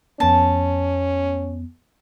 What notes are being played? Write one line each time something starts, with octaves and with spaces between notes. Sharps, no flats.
F2 B3 C#4 A5